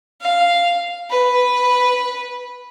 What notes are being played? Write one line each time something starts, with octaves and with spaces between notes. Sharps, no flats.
F5
B4